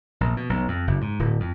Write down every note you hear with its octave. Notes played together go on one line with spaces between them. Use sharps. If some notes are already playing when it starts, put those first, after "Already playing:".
A#1
B2
B1
F2
F#1
G#2
D1
F2